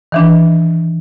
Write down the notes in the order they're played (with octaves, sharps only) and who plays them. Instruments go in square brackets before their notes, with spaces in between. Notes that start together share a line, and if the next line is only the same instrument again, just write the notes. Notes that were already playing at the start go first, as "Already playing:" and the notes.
[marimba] D#3 E3 D4